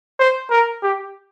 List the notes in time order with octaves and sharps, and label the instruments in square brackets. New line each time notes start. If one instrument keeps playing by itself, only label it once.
[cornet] C5
A#4
G4